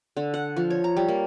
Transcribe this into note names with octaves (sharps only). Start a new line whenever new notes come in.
D3
F#5
F3
C#5
A#5
G3
A#3